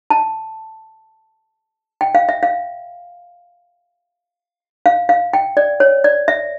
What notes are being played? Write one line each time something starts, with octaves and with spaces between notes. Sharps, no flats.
A5
G5
F5
E5
F5
F5
F5
G5
D5
C#5
D5
E5